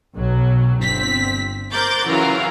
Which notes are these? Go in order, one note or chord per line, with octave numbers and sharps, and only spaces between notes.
B1 F#3
G1 C4 B6
A#4 C5 D6 F#6 G6 A6
C#3 E3 F#3 F4 F#4 A#4